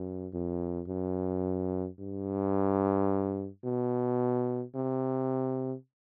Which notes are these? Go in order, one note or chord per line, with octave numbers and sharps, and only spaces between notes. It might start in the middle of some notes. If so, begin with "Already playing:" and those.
Already playing: F#2
F2
F#2
G2
B2
C3